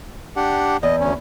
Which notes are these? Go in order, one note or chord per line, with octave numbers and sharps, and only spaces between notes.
D4 G4 F#5
E2 D#5
D2 C#4